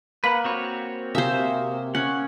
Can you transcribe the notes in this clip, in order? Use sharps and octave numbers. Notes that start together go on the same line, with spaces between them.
A#3 B4 F#5
C4 F#4 C#5
C3 G#4 C5 E5 F5
C#4 F#5